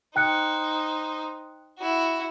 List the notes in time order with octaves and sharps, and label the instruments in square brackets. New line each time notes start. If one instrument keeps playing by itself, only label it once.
[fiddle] D#4 C5 [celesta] G5 F#6 C#7
[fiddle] E4 F#4